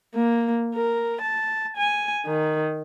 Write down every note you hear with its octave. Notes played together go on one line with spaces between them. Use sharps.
A#3
A#4
A5
G#5
D#3